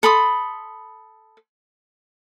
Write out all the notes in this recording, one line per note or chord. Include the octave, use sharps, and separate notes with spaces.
A4 B5 C6 D#6